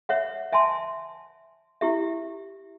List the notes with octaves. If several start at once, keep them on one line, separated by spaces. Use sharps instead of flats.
C#5 E5 F#5
E5 G#5 A5 C6
E4 G4 E5